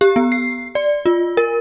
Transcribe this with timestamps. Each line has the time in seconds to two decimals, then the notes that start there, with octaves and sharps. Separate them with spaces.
0.01 G4
0.16 B3
0.32 C7
0.75 D5
1.06 F4
1.37 A#4